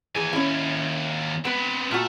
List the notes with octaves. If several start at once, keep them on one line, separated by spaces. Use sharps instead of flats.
D#2 E3 G#4 G#5
C#4 E4
B3 C4 B4
A#2 A3 F#4